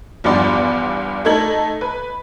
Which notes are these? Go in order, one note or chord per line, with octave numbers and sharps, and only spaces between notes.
E2 G2 F3 B3 D5 C6
A3 D#4 A4 G#6 F#7
B4